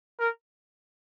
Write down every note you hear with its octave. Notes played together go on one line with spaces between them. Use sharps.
A#4